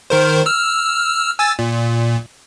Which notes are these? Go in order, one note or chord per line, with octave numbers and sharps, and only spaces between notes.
D#3 A#4 C5
E6 F6
G#5 E6 A6
A#2